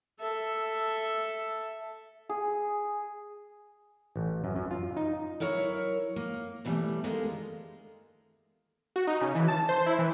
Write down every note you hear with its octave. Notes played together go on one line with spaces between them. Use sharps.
A4 E5
G#4
A1
F#2
F#2
F4
D#4
F#3 E4 A#4 C#5
A#3
B2 E3 F3 G3 A3
D3 D#3 G#3 A#3
F#4
D#4
C#3
E3
A5
C5
E4
E3